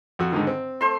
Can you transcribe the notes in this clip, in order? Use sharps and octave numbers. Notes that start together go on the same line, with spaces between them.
F2 F#4
G#2 D3 D#3
C4
A3 C5 C6